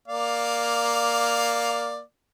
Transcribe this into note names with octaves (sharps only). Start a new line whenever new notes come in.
A#3 D5 F5